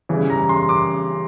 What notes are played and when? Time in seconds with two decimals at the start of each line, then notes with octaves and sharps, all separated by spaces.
0.09 C#3 E3 G3
0.30 A#5
0.49 C6
0.69 D6